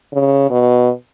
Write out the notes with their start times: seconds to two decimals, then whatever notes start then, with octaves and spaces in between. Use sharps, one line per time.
0.13 C#3
0.50 B2